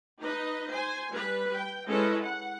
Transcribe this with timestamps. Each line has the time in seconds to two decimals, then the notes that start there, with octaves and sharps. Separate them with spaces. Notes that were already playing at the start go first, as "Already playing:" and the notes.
0.23 D#4 B4 D#5
0.70 C5 G#5
1.11 G3 B4
1.54 G5
1.89 G#3 C#4 E4 A4 B4 D#5
2.22 F#5